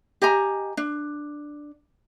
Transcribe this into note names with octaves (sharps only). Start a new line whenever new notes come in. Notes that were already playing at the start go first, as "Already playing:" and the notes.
G4 D#5 G#5 A#5
D4